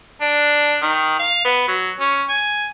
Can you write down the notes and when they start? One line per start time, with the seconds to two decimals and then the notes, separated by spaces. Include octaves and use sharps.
0.21 D4
0.82 D#3
1.19 F5
1.45 B3
1.68 F#3
2.00 C#4
2.29 G#5